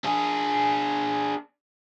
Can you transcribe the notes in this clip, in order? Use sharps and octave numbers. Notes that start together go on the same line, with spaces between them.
D4 G#4